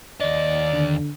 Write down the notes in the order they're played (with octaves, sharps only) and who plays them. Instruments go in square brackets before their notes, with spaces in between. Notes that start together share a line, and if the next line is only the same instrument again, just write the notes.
[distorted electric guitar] D#2 D#5 [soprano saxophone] D5
[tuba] D3